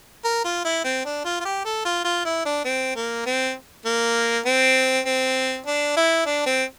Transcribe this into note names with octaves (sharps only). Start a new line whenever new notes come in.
A#4
F4
E4
C4
D4
F4
F4
G4
A4
F4
F4
E4
D4
C4
A#3
C4
A#3
C4
C4
D4
E4
D4
C4